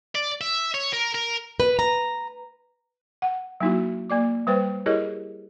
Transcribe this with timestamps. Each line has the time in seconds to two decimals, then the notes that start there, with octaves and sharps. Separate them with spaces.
0.15 D5
0.41 E5
0.74 C#5
0.93 A#4
1.15 A#4
1.60 B4
1.79 A#5
3.22 F#5
3.60 F#3 A#3 D#4 E4 F#4
4.09 A#3 D5 D6
4.47 G3 B4 C5 G5
4.86 E4 G4 G#4 A#4 C#5 D#5